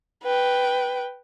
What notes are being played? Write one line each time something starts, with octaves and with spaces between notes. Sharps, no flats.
B4 G5